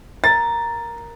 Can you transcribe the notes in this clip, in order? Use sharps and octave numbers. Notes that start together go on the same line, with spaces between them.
A#4 A6